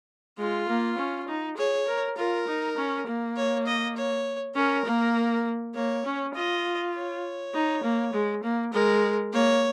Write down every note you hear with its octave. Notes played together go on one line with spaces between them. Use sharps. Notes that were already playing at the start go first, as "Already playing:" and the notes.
G#3 F4
A#3
C#4
D#4
G#4 C#5
A#4
F4 A#4
D#4
C#4
A#3
C#5
D#5
C#5
C#4 A#4
A#3
A#3 C#5
C#4
F4 D#5
C#5
D#4
A#3
G#3
A#3
G#3 A#4
A#3 C#5